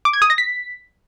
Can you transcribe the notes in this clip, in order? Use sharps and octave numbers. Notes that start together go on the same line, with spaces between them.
D6
G#6
D#6
A#6
B6